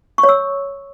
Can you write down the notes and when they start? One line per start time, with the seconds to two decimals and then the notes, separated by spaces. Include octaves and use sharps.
0.18 C#6
0.23 C#5
0.29 E6